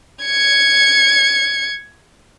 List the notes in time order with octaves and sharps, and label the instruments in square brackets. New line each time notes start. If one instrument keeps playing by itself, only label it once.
[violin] G#6 C#7